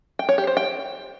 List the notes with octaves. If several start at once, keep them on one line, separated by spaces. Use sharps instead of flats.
G5
C#5
G4
C5
G5